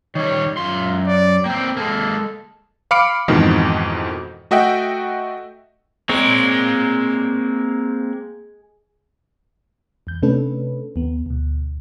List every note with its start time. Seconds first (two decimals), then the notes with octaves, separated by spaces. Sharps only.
0.15 D#3 G3 C#5
0.57 F#2 F4 C6
1.06 D5
1.46 A#3 C4 G5
1.77 G#3 A#3 A4
2.91 F5 B5 D6 F6 C#7 D7
3.28 F2 G#2 B2 D#3 E3
4.51 A3 F#4 D#5 E5 F#5 G5
6.09 G#3 A#3 C4 C#5 D5
10.07 E2 G6
10.22 C3 A3 C#4 D4 A4 B4
10.96 D#2 B3
11.26 D2 B2